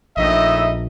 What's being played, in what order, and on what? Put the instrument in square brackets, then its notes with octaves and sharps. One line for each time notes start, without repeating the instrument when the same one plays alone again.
[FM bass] A#1 [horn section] A2 D#4 E5 [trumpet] D#5